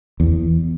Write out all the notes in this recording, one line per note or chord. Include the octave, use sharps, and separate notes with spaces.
E2